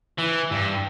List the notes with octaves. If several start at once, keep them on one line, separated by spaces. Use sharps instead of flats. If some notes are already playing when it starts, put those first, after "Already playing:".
E3
G2